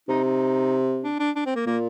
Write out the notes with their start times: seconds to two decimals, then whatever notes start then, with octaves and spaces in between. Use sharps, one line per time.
0.08 C3 D#4
0.24 D#4
1.04 D4
1.20 D4
1.36 D4
1.46 C4
1.55 A#3
1.66 A#2 A#3